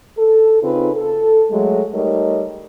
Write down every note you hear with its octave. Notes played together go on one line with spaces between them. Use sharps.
A4
C#3 C4 C#4 D#4 F4 B4
A4
F#3 G#3 A3
G3 A3 D#4 A#4 C#5 D#5